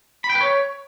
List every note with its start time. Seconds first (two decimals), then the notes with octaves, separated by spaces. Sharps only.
0.24 B5
0.30 G5
0.35 B4
0.41 C#5